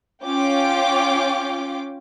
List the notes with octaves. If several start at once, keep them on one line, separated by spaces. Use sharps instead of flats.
C#4 F4 G5 D6